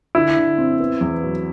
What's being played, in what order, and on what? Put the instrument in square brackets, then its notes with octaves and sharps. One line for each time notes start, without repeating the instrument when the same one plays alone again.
[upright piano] D3 [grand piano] E4
[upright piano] D3
C4
B3
E2
F#3